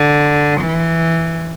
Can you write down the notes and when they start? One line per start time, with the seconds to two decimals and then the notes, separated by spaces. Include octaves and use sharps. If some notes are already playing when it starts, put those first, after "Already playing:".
Already playing: D3
0.61 E3